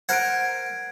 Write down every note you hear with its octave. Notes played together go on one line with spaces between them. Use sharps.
A#4 C5 F#5 G#6 D7